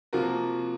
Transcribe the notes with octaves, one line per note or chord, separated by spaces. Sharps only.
C3 F3 A#3 F#4 A#4